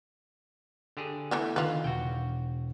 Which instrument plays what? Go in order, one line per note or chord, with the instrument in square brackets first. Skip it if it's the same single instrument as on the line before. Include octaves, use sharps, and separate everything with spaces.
[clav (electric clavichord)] D3 G4 G#4
[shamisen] E3 A3 B3
[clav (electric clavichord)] D3 [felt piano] D#3 [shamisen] F4 B4
[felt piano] E1 [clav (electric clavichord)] F#4 G5